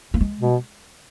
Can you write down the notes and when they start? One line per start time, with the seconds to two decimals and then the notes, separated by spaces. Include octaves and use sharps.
0.14 A#3
0.21 G#3
0.40 B2